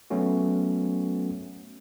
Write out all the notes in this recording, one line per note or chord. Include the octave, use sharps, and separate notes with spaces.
F#3 A3 B3 C#4 F#4